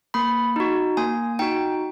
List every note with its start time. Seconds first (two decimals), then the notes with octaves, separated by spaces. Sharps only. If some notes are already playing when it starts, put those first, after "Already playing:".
0.14 A#3 B5
0.56 D#4 F#4
0.97 A#3 G#5
1.39 D#4 F#4 G5